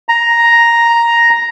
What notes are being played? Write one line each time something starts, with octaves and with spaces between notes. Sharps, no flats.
A#5